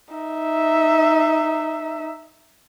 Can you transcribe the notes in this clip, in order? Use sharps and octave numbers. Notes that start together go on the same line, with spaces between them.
D#4 E5